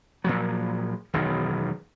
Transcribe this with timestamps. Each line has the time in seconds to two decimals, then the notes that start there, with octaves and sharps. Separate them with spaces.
0.24 A#2 F3 F#3
1.13 E1 B1 F#2 D#3